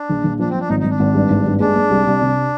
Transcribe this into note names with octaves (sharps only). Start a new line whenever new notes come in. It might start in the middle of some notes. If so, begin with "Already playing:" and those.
Already playing: D4
A#1
A#1
F3 D4
C4
F3
D4
G#1 D#4
G#1 D#4
D4
G#1
G2
G#1
G2
G#3 D4
G#3
C2
C2
C3